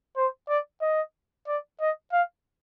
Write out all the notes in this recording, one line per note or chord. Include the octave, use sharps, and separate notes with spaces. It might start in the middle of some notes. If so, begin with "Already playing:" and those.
C5
D5
D#5
D5
D#5
F5